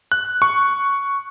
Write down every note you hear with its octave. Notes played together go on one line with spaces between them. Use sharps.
F#6
C#6